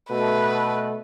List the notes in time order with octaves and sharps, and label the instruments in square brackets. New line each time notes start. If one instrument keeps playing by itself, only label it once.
[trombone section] B2 A3 [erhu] B4